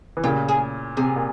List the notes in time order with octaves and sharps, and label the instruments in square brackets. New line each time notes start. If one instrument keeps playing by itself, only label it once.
[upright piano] E3
[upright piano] A#2 C#3 [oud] G4
[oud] G#4
[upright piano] C3 [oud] G#4
[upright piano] A#2